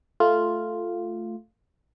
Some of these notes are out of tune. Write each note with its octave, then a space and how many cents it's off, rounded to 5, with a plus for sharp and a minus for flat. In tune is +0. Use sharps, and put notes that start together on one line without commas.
A3 +0 F4 +0